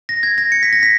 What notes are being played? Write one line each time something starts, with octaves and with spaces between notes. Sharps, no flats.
A#6
G#6
A#6
C#7
B6
A#6
B6